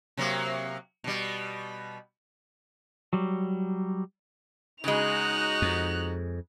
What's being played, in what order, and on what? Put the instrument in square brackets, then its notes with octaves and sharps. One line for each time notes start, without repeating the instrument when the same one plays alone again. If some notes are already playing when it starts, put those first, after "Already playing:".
[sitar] C3 F#3 A#3
B2 G3
[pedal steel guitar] F#3 G3
[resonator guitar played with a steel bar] C#3 G#3 [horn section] D#4 F#4 [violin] F#6 F7
[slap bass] F2